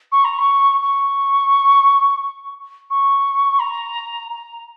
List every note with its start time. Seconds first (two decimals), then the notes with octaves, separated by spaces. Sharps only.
0.12 C#6
0.24 A#5
0.38 C#6
0.81 C#6
2.90 C#6
3.59 A#5
4.29 A#5